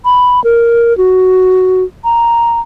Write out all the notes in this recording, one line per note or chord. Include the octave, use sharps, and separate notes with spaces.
B5
A#4
F#4
A#5